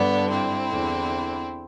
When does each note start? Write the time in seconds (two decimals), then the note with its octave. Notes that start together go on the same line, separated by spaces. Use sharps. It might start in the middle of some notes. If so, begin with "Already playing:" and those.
Already playing: G2 D3 B3 D4
0.29 C4 E4
0.69 E2 D3